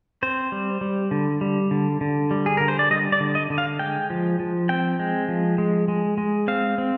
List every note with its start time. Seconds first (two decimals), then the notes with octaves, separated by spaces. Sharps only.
0.23 C4 C5
0.52 G3
0.81 G3
1.11 D3
1.41 G3
1.71 D3
2.01 D3
2.31 G3
2.46 G#4
2.57 D3 A#4
2.68 C5
2.79 D5
2.90 G3 D#5
3.12 D5
3.20 D3
3.35 D#5
3.50 D3
3.58 F5
3.79 G#3 G5
4.10 F3
4.39 F3
4.69 C4 G5
4.99 G#3
5.29 F3
5.58 G#3
5.88 G#3
6.18 G#3
6.48 C4 F5
6.78 C4